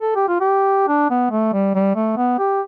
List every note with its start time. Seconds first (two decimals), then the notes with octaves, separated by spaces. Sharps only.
0.01 A4
0.15 G4
0.28 F4
0.40 G4
0.88 D4
1.10 B3
1.31 A3
1.53 G3
1.75 G3
1.95 A3
2.17 B3
2.39 G4